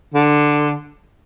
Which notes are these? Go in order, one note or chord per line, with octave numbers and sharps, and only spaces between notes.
D3